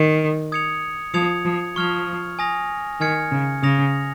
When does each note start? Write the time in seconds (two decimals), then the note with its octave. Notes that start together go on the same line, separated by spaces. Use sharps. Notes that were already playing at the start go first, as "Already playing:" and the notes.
Already playing: D#3
0.52 D#6 G#6 C#7 F7
1.14 F3 D#6 G#6 C#7 F7
1.45 F3
1.76 F3 C#6 F6 G#6 F7
2.39 G#5 D#6 A#6 F7
3.00 D#3 G#5 F6 G#6 C#7
3.32 C#3
3.63 C#3 D#6 A#6 F7